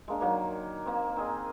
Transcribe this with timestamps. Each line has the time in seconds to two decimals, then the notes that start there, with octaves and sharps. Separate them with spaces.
0.08 G#3 A#3 D4
0.21 D#3 F#3 A#3
0.86 A#3 C4
1.16 C4 G#4 D#5